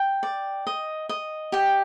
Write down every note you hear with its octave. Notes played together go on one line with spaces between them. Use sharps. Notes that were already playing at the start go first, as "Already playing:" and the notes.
Already playing: G5
D5
D#5
D#5
G4 G5